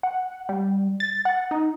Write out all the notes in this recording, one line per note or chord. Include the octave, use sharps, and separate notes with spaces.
F#5
G3
A6
F#5
D#4